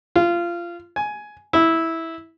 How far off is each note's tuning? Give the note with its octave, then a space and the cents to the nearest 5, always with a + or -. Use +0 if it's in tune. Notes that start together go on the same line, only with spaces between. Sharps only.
F4 -20
G#5 +10
E4 -10